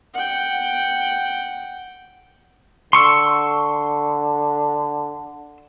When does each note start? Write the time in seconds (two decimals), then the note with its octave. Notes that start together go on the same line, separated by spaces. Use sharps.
0.14 F#5 G5
2.93 D3 C6 C#6 E6